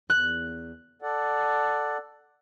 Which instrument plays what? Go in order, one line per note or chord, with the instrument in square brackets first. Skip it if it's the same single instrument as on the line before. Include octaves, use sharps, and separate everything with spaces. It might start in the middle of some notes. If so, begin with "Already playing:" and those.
[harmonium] E2 [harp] F#6
[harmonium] A4 D5 F#5